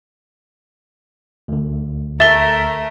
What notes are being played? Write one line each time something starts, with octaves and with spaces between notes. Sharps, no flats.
D2 D3
A3 A#4 E5 A6 G7